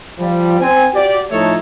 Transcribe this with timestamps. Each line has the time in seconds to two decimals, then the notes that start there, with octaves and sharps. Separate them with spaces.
0.19 F3 G3
0.60 C4 G#5
0.95 F#4 G4 D5
1.31 A2 F3 A3 D#4 A4 C#5